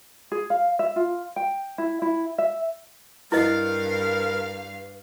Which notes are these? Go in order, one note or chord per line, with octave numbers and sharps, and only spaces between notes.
G#4
F5
E5
F4
G5
E4
E4
E5
G2 E4 A#4 B4 D#5 F5